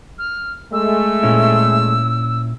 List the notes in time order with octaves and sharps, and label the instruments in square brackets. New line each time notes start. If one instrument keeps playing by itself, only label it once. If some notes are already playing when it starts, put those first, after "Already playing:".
[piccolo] F6
[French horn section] G#3 A3 [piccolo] E6
[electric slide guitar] A#2 C#4 E4